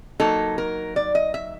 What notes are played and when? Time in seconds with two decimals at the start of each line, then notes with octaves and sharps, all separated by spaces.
0.20 F#3 A#3 D#4 A4
0.58 A#4
0.96 D5
1.15 D#5
1.34 E5